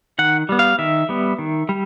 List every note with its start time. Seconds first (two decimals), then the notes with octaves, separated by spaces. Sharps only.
0.19 D#3 F#5
0.49 G3 B3
0.59 F5
0.79 D#3 E5
1.09 G3 B3
1.38 D#3
1.69 G3